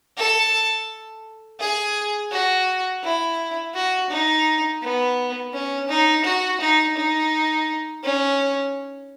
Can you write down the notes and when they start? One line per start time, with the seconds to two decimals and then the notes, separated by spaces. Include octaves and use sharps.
0.17 A4
1.60 G#4
2.32 F#4
3.03 E4
3.74 F#4
4.10 D#4
4.82 B3
5.53 C#4
5.89 D#4
6.25 F#4
6.60 D#4
6.97 D#4
8.04 C#4